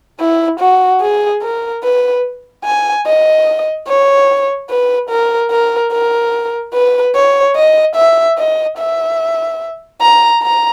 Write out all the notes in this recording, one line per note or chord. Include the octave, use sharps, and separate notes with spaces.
E4
F#4
G#4
A#4
B4
G#5
D#5
C#5
B4
A#4
A#4
A#4
B4
C#5
D#5
E5
D#5
E5
A#5
A#5